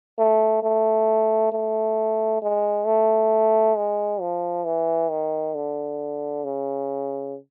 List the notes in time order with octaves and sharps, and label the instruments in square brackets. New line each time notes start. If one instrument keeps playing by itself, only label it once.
[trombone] A3
A3
A3
G#3
A3
G#3
F3
E3
D#3
D3
C#3